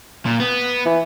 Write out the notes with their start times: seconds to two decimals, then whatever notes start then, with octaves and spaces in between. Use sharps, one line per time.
0.26 A#2
0.40 B3
0.85 E3